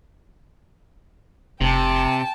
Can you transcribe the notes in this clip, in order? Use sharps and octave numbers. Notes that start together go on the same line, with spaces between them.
F1 C3 G5 A5